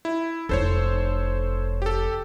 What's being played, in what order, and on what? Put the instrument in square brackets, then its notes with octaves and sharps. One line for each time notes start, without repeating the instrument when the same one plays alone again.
[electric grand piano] E4
[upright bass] F1 E4 [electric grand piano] A4 C5 C#5
[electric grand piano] G4 A4